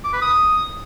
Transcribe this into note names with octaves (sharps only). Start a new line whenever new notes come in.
D6
B4
D#6